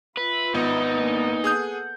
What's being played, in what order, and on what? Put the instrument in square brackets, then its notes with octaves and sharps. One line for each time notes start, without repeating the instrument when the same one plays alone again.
[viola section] F4 E5 B5 [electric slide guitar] B4
[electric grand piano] G#1 [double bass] B3 [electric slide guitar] D#4
[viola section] A#3 D4 G#5
[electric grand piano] G#4 D#6 G6 [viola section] A4 F#5